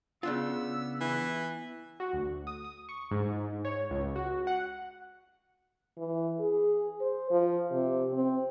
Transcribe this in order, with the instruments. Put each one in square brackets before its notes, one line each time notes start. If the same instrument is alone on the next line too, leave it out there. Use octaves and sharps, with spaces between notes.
[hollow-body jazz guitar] C#3 D4 F4 [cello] B3 [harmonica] E6
[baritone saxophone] E3
[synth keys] F#4
D2
D#6
D#6
C#6
G#2
C#5
C#2
F#4
F#5
[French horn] E3
G#4
C5
F3
C3
C4